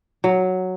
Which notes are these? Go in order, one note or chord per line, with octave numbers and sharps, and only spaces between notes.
F#3